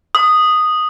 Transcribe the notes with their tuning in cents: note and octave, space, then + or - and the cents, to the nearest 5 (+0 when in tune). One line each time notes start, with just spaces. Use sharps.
D#6 -5